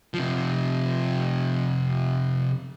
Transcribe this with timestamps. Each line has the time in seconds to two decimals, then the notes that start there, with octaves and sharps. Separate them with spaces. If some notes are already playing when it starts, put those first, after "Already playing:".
0.14 C3 F3